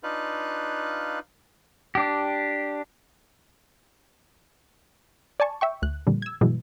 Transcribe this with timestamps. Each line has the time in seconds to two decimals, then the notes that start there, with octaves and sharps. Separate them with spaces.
0.03 D4 D#4 F4 B4 F5 F#6
1.95 D4 G4
5.40 D5 G#5 A5 C#6
5.61 E5 G5 C#6
5.82 D2 F#6
6.07 F2 A#2 D3 G3
6.22 E6 G#6
6.41 G2 B2 E3 F#3 G#3